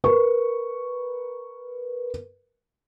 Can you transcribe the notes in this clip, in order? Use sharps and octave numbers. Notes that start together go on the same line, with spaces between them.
A#4 B4 C#6